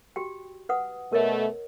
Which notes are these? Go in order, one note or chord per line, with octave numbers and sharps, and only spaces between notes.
F#4 G4 G5
B4 F#5 D#6
B2 A3 A#4 C#5 D#5